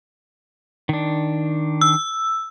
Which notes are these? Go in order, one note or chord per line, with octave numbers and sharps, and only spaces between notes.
D#3 D4
E6